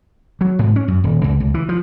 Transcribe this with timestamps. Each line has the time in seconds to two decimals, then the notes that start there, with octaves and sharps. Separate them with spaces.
0.41 F#3
0.59 G#2
0.76 C#4
0.88 F#2
1.04 D#1
1.24 C#2
1.40 C#2
1.54 E3
1.69 F3